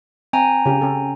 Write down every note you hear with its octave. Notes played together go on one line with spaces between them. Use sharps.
C4 G5 G#5 A#5
C#3 G4
C#4 A4